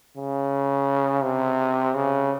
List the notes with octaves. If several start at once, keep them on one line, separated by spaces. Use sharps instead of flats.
C#3
C3
C#3